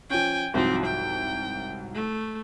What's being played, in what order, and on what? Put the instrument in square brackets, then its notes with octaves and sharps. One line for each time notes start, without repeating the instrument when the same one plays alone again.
[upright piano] F3 C#4 [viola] G5 G#5
[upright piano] C2 G#2 F#3 [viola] F3 C4
[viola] G5
A3